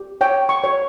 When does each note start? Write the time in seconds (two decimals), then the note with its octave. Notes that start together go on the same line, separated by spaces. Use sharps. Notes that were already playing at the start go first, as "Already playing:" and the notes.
Already playing: G4
0.21 C#5 G5
0.49 C#6
0.64 C#5